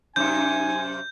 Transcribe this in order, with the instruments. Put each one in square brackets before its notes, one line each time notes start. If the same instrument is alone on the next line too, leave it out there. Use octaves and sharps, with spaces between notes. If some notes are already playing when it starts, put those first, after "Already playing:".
[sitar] F#2 C3 [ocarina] D#4 [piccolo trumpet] G#5 [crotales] G6